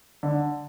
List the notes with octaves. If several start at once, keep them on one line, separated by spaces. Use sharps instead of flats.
D3